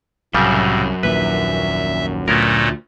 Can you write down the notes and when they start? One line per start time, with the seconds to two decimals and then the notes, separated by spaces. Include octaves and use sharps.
0.34 C2 F#2 A2 C#3 G3
1.03 A#1 D#2 A#2 B4 E5
2.28 D2 A#2 A3 B3 C#4 A#4